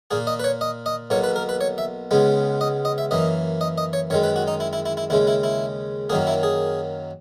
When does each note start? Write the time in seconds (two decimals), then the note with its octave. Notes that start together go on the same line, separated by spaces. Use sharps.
0.11 A#2 A#3 G#4
0.27 D#5
0.40 B4
0.44 C#5
0.61 D#5
0.86 D#5
1.10 B1 B2 A#3 C#5
1.24 B4
1.36 A#4
1.49 B4
1.61 C#5
1.78 E5
2.11 C#2 C#3 G#3 B3
2.61 D#5
2.85 D#5
2.98 E5
3.11 F#2 E3 A#3 D#5
3.61 D#5
3.78 D#5
3.93 C#5
4.10 F#2 D#3 G#3 C#5
4.23 B4
4.36 F#4
4.48 D#4
4.60 E4
4.73 E4
4.86 E4
4.97 E4
5.10 D#2 C#3 G#3 E4
5.27 E4
5.44 E4
6.10 F#2 D#3 F#3 A#3 G#4
6.27 E4
6.43 G#4